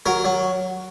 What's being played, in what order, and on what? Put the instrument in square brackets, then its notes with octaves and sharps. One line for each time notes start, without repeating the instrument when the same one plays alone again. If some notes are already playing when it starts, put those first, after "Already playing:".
[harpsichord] F#3 A#4
F#3